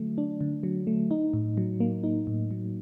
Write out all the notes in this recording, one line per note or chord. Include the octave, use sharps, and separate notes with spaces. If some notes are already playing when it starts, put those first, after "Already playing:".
Already playing: D3 F#3 A3
D4
D3
F#3
A3
D#4
A2
F#3
A#3
D#4
A2
F#3